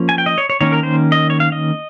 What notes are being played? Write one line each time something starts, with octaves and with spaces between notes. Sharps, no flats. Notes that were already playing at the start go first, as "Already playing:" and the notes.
Already playing: F3 A#3 C#4
G#5
G5
D#5
C#5
C#5
D#3 A#3 C#4 C#5
A#4
C5
D#5
C#5
F5
D#5